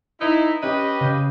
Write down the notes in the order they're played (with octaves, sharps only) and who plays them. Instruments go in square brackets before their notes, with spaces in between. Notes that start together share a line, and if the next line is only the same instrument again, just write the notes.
[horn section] D#4 E4 [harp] B4
[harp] C#4 [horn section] G4 B4 D#5
[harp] C#3 G6 C7